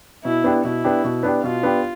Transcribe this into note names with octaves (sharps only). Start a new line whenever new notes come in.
B2 E4
B3 D4 G4
B2 E4
B3 D4 G4
B2
B3 D4 G4
B2 F4
B3 D4 G4